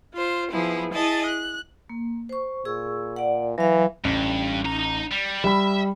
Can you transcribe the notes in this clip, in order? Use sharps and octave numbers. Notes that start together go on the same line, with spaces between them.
F4 C5
F3 B3 E4 G#4
E4 G#4 D#5 A5
F#6
A#3
C5 C#6
A#2 G#4 C#6 E6
D5 F#5
E3 F#3 F5
A1 G2
D#4 A#5
G3
G3 E5 B5